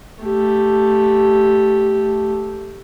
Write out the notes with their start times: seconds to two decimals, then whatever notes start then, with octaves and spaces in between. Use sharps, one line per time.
0.24 A3 G4